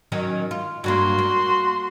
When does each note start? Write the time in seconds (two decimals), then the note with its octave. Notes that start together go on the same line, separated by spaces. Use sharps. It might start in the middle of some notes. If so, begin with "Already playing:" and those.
0.12 D#3 F#3 C#4
0.51 F4
0.84 G2 F#3 A#3 F#4 C6
1.19 A#3